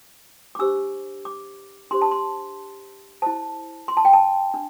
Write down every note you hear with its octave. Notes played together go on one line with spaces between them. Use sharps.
D6
D4 G4 C5 E6
D6
D4 G4 C5 C6
A5
C6
E4 C5 A5
C6
A5
G5
A5
D4